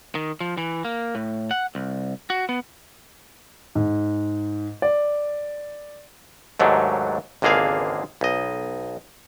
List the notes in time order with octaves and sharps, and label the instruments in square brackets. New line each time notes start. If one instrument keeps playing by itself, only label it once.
[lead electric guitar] D#3
F3
E3
A#3
A2
F#5
C2
F#4
B3
[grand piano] G#2
D5
[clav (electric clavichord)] D#2 G#2 F#3 A3 D4
G#1 C#2 D3 A#3 G#4 F5
B1 D#5